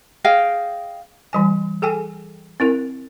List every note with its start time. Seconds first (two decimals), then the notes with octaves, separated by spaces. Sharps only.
0.24 G#4 D#5 F5 G5
1.33 E3 G3 G#5
1.82 G#4 A4 G5 G#5
2.60 C4 E4 A#4